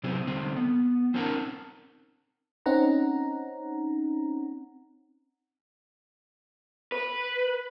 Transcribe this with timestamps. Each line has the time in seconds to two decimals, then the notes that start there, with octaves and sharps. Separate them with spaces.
0.04 C3 F#3 C4 E4 G#4
0.27 D3 G3 C4
0.57 B3
1.14 C4 C#4 D#4 A#4 F#5 A5
2.66 C4 C#4 D#4 F#5 A#5
6.92 B4